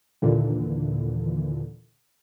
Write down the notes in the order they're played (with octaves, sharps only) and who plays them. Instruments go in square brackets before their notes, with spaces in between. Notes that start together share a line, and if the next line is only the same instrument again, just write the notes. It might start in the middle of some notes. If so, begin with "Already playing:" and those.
[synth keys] D#2 A#2 D3 E3